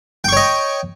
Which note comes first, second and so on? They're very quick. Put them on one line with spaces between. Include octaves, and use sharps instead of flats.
G5 C#6 C#5 D#5